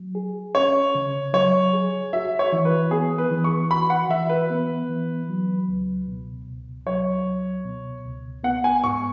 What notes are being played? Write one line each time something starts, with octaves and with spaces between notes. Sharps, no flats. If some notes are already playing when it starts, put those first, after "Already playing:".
Already playing: F#3
G#4
C#4 C#5
C#3
F#3 C#5
G#4
F#4 E5
C#5
E3
B4
B3 G#4
B4
E3
C#6
F#4 B5
F#5
E3 E5
B4
B3
E3
F#3
C#2
B2
C#2
F#3 C#5
C#2
B2
C#2
B3 F#5
G#5
G#2 C#6